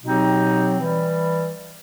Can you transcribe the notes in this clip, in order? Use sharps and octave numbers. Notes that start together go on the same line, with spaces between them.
B2 F#3 C4 D#4 G4
E3 G3